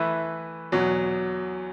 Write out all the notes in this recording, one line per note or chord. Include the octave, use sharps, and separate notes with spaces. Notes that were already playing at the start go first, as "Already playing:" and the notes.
Already playing: E3 A3 E4 B4
E2 B2 F#3